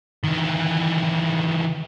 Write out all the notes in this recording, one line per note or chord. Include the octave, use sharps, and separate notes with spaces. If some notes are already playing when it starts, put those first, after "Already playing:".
D#3 E3